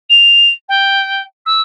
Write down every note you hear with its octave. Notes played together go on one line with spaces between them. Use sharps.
F7
G5
E6